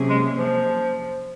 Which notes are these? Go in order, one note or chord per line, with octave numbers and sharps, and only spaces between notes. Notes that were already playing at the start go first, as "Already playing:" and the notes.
Already playing: C3 F#3 A#3 C#4 G#4
G#3
F3